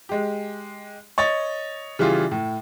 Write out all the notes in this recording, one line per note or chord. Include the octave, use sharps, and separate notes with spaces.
G#3 G4
C#5 D#5 A6
C#3 E3 G3 F4 G#4
A2